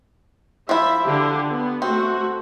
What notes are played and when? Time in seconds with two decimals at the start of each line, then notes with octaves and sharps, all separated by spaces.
0.69 F3 E4 E5
1.04 D3 G4
1.50 B3
1.82 A3 C4 F#4